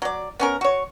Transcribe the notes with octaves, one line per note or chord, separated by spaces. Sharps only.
F#3 D5
B3 C#4 A#4
F#4 C#5